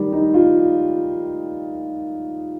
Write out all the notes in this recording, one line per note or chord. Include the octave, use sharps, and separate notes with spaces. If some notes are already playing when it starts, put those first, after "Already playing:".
Already playing: D#3 G3
D#4
F4